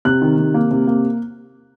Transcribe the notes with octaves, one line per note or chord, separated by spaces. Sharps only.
C3 F#6
D#3
C3
A#3
C3
A#3